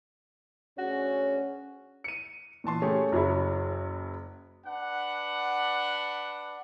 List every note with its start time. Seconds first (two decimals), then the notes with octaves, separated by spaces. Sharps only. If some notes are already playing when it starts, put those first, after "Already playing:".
0.78 D2 C#4 F#4 G#4 C#5
2.04 C#7 D#7
2.64 A#2 E3 A5 C6
2.82 A3 C#4 G4 G#4
3.12 F#1 F#3 C#4 E4
4.65 D4 B4 F#5